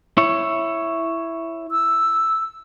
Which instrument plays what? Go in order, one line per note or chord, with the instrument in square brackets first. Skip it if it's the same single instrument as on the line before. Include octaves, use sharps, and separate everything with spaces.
[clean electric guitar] E4 C#5
[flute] E6